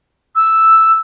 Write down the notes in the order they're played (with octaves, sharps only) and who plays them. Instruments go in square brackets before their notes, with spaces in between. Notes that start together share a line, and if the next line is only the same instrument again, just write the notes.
[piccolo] E6